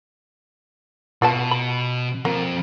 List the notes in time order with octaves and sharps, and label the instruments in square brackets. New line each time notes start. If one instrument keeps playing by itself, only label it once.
[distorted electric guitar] B2 [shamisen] F4 B4 A5
[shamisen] B5
[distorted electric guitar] F3 C4 [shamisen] A#3